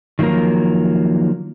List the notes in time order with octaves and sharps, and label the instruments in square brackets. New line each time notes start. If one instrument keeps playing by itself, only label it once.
[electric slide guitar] D#3 F3 F#3 A#3 A#4